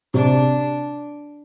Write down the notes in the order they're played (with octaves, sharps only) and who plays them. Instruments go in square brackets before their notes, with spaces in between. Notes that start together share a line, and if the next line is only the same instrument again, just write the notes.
[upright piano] C3 [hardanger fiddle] D4